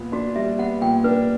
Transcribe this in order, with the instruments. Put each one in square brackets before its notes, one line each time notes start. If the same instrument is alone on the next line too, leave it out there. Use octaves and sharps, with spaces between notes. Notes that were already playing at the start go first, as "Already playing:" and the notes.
Already playing: [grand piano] A#2 B3
[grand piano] D4 [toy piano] F#4
[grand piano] G3 [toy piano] E5
[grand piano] B3 [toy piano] F#5
[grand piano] A#2 [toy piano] G5
[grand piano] D4 [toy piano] B4